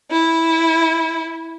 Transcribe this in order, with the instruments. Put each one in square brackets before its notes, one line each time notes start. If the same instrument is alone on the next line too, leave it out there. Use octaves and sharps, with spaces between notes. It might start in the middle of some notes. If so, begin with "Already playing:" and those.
[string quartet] E4